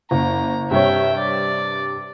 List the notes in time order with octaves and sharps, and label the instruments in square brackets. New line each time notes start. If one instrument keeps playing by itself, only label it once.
[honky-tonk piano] F#1 [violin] A#5
[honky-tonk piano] G2 C3 C#5 [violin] E5 G5
[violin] D5